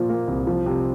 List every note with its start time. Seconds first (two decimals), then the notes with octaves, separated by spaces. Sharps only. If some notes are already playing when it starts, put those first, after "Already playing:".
Already playing: A#2 F3 C5
0.09 A#3
0.28 C2
0.47 F3
0.66 C3